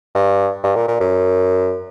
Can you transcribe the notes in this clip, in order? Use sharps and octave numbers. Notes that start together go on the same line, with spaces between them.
G2
G2
A#2
A#2
F#2